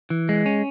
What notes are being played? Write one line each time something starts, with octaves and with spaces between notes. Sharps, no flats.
E3
G#3
C#4